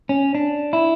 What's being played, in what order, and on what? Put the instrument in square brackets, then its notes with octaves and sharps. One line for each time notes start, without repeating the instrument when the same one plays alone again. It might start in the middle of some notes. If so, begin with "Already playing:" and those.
[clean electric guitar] C#4
D4
E4